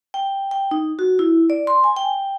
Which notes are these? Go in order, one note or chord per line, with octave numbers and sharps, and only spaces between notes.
G5
G5
D#4
F#4
E4
D5
C6
G#5
G5